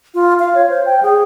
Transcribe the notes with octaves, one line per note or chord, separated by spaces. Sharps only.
F4
F5
C#5
C5
G5
G#4